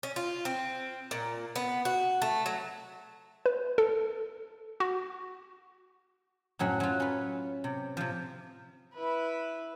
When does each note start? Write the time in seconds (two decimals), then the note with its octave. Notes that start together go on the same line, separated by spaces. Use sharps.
0.03 C#4
0.16 F4
0.45 C4
1.11 A#2
1.56 B3
1.85 F#4
2.22 A3
2.46 F#3
3.46 B4
3.78 A4
4.80 F#4
6.59 F#2 A2 F#3 C#4
6.80 F#3 F4
7.00 C#4 B4
7.64 C3
7.97 C3 F3
8.95 E4 B4